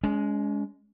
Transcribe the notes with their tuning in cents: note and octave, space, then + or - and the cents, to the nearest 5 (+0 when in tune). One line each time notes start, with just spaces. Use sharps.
G#3 +0 C#4 +35